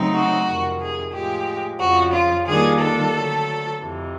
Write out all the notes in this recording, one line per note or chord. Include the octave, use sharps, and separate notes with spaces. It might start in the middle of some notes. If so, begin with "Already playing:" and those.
Already playing: C#3 F#3 A3 C4 D#4
F#4
F2 C3 D#3
G#4
A2 F3 G#3 G4
F2 C#3 F3 F#4
F4
D#3 G3 A#3 D4 F4 G#4
A4
D3 F#3 A3
F2 C3 E3